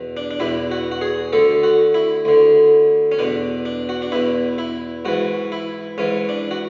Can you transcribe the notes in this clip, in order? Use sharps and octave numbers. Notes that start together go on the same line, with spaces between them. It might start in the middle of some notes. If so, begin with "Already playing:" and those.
Already playing: E2 B2
D4
D4
E2 B2 E4
F#4
F#4
G#4
D2 D3 A4
F#4
E4
D2 D3
C#4
E2 B2 D4
D4
F#4
D4
E2 B2 E4
E4
G#2 E3 F#4
E4
G#2 E3 C#4
D4
F#4